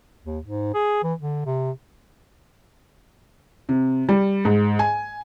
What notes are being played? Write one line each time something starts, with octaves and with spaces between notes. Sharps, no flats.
D#2
G#2
G#4
E3
D3
C3
C3
G3
G#2
G#5